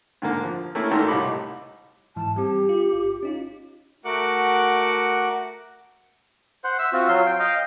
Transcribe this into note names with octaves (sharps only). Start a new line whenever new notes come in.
G#2 D3 A#3
F3
A3 A#3 C#4 E4
G#1 D#3 A4 A#4 A#5 C6
C2 A2 D#4 G4 B5 D6
G#2 E3 A5
G3 C4 G4
F4
G1 F4
C#4 D#4 F4
A3 F#4 A#4 F#5 D6 F#6
C5 F#5
E5 E6
C4 F4 F#4
F#3 F4 C6
G5
D#5 F5 G5